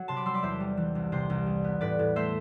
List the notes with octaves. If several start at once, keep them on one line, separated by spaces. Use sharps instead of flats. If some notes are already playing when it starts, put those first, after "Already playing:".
Already playing: F#3 F#5
C3 A5 C6
B5 D6
G3 C6 E6
B5 D6
E2 C5 E5
G3
E3
C2
C3 C5
C2
G3
B3
A2 B4 D5
A2
A3 C5 E5